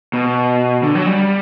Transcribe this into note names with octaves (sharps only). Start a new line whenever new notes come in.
B2
D3
F#3
G3